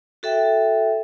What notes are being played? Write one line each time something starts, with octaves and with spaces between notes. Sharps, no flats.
F#4 A4 E5 G5